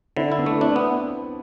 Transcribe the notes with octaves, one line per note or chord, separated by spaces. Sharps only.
D3 C4 E4
E4
B3 D4
A3
C4 D4 E4
B3